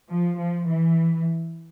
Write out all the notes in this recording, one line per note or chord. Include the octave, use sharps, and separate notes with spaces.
F3
F3
E3